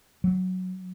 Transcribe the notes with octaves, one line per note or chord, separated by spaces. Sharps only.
F#3